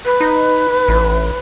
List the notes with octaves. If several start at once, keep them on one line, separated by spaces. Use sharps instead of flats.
B4
D#4
A1